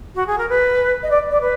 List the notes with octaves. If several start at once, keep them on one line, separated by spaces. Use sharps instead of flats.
F#4
G#4
A#4
B4
D#5
D5
D5
B4